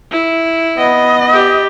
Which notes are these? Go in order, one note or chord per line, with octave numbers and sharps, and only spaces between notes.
E4
B3 D#5
G4